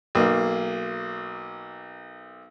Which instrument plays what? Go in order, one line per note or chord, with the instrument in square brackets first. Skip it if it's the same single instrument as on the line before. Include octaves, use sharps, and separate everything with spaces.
[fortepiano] B1 A#3